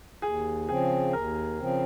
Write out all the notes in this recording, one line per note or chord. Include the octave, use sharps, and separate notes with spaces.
D#2 G#4
C#3 F3 C4 G#4
D#2 A#4
C#3 F3 C4